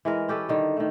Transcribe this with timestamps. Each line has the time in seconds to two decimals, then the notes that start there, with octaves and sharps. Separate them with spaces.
0.05 E3 G#3 A#4
0.28 C#4 G4 A4 B4
0.49 D3 D#3 G3
0.77 D#3 A3